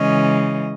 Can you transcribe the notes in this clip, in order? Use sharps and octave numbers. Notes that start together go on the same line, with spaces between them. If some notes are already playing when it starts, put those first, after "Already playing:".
Already playing: C#3 E3 G#3 C#4 D#5